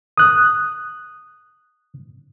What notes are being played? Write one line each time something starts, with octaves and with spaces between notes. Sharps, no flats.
D#6 F#6